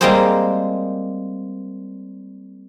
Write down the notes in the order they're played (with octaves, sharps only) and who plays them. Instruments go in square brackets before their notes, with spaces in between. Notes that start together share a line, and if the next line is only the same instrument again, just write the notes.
[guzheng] G3 G#3 A#3 C4 G#4 C5